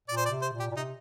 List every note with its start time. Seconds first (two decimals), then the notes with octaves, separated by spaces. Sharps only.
0.08 A#2 D5
0.17 C5
0.26 D5
0.30 C3
0.42 C5
0.53 A#2
0.60 G4
0.71 A#2
0.76 C3 D#4